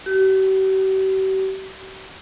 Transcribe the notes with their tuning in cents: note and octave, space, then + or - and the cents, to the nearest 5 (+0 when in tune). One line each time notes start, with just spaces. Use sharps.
G4 -45